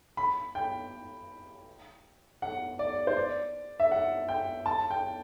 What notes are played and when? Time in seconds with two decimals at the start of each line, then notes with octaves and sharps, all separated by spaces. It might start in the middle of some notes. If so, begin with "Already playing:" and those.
0.17 B5
0.55 G5
2.42 F#5
2.79 D5
3.07 C5
3.17 D5
3.80 E5
3.91 F#5
4.29 G5
4.66 A5
4.91 G5